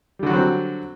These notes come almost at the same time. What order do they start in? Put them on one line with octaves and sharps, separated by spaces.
G3 D3 F#4 F#3 C4